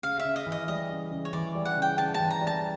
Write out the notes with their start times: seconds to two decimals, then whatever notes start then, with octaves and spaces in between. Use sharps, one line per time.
0.03 C#3 F5
0.20 E5
0.25 C#3
0.36 D#5
0.46 E3
0.52 D#5
0.68 G3 D#5
0.90 C#3
1.11 C#3
1.25 C#5
1.33 E3 D5
1.55 G3
1.65 F#5
1.77 C#3
1.82 G5
1.98 C#3 A5
2.14 A5
2.20 E3
2.30 A#5
2.41 G3
2.47 A5